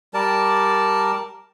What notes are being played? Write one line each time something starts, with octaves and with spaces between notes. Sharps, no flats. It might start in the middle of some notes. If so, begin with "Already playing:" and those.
G3 A#4 D5 A5